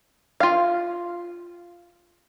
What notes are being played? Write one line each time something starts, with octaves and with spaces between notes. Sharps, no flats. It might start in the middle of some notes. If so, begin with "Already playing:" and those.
F4 F5